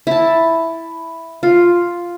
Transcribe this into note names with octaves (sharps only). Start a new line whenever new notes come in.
E4 A5
F4